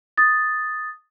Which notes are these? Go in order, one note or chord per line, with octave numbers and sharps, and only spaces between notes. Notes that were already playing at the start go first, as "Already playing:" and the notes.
D#6 A6